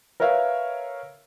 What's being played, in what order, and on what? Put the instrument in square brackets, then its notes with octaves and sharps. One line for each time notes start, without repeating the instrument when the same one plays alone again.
[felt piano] A#4 B4 C#5 E5 F5